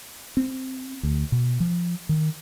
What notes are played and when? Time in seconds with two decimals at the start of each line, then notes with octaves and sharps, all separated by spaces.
0.37 C4
1.03 D2
1.32 B2
1.60 F3
2.09 D#3